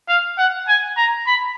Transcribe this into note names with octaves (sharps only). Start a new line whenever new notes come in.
F5
F#5
G#5
A#5
B5